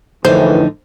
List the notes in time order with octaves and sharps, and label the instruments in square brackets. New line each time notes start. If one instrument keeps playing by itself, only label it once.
[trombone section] A#1 A2 E3 [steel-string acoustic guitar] F2 D3 D#4 [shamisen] C5